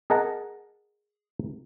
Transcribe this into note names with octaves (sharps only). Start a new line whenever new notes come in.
G#4 A#4 D#5 F#5 A5 A#5